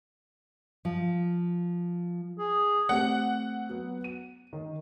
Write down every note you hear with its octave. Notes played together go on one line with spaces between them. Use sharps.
F3
G#4
A3 C4 G4 F#5
F#3 B3
D#7
D#3